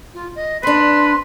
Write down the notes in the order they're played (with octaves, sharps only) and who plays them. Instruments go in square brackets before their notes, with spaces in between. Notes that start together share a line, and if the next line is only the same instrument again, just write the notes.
[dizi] F4
D#5
[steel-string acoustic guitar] C4 D4 [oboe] B4 [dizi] C6